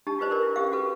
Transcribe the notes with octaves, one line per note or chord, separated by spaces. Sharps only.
D4 D#4 G4 A5
F4 G4 B4 C5 D5
A#4 D5
E4
C#4 G4 F5
F#4 A4 B4